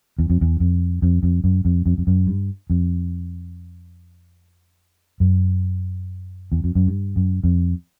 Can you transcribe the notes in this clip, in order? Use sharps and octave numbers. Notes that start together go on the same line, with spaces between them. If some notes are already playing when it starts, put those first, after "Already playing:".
E2
F2
E2
F2
F2
F2
F#2
F2
F2
F2
F#2
G2
F2
F#2
E2
F2
F#2
G2
F#2
F2